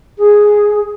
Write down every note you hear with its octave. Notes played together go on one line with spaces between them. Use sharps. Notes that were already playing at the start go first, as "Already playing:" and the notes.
G#4